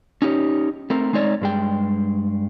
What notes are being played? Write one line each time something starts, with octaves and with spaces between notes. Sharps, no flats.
C#4 D#4 G4 C#5
A3 C4 A#4
G#3 C4 D#4 C#5 D5
G2 G#3 G5